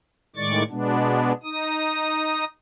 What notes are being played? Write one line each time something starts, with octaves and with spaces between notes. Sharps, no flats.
A2 D#3 G#3 D5 C#6 A6
B2 G#3 B3 D4
D#4 D#6